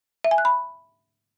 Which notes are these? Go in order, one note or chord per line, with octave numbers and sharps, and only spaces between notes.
E5
G#5
F#6
B5